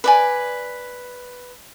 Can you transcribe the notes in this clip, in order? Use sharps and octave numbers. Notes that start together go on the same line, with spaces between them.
B4 D5 G#5